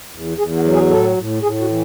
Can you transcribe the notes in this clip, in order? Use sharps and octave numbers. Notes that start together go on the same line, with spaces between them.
E2
E2 G#4
F#4
F#3
G#4
A2 A4
A2
A2 G#4
F#4
E3